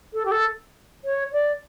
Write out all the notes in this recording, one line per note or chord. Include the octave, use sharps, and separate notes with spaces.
A4
G4
A4
C#5
D5